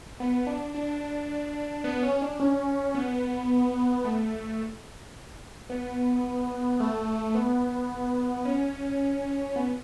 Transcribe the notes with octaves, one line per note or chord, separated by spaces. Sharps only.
B3
D4
D4
B3
C#4
D4
C#4
B3
A3
B3
A3
B3
C#4
B3